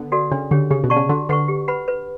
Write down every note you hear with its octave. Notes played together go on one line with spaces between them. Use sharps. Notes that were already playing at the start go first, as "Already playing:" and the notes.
Already playing: D3 B3
F#4 A4 D5 F#5
C#3 D4
D3 G4 C#5
C#3 G4
B2
D5 F#5 A5 C#6
C#3
D3 F#4
D3 B4 F#5 C#6
G4
B4 F#5 B5
B4